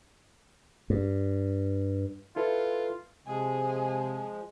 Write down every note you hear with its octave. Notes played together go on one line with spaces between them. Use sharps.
G2
E4 F4 A4 B4
C3 F3 G#3 G#4